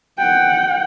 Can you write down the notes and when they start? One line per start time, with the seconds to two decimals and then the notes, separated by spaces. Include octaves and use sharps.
0.19 F#5 G5